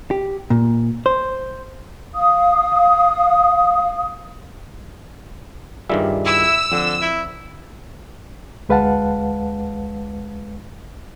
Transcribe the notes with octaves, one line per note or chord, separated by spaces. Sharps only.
G4
A#2
C5
F5 D#6
G2 D#3 G3 F4 G#4 E5
E4 E6
D3 F3 C4
E4
D2 G#3 B4 F5 F#5 A5